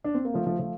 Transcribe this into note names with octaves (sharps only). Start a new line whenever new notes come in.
D4
C4
A#3
F3 A3
F3 A3
F3 A3